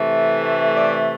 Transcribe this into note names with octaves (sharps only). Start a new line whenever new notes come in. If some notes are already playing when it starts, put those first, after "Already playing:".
Already playing: C3 E3 A3
D5